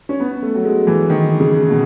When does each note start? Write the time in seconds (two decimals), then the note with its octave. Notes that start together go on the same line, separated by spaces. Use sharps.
0.09 C#4
0.20 B3
0.42 A3
0.55 F#3
0.65 G#3
0.87 E3
1.10 D#3
1.40 C#3
1.70 B2